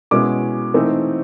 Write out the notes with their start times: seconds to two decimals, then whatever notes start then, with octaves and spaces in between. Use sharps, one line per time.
0.11 B2 G#3 C#4 E4 D6
0.74 E3 A3 C4 D#4